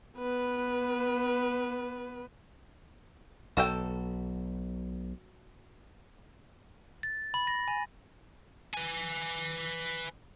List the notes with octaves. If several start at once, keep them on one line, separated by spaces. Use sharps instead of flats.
B3 B4
B1 F#4 A4 G5
A6
B5
A#6
G#5
B4 G#5